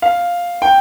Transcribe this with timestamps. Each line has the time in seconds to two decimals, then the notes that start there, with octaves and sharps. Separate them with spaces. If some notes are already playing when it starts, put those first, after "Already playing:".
0.02 F5
0.62 G5